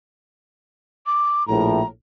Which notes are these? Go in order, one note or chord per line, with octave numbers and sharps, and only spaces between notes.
D6
A#1 A2 A#5